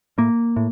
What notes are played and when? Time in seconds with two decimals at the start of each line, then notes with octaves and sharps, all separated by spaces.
0.18 A2 A#3
0.56 A2